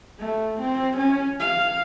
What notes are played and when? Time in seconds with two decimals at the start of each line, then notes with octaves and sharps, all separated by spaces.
0.20 A3
0.61 C4
0.97 C#4
1.40 F5